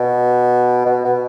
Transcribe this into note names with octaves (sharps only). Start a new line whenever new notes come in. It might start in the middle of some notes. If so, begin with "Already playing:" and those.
Already playing: B2
B2
B2